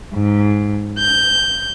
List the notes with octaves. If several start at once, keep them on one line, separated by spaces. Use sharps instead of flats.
G#2
G6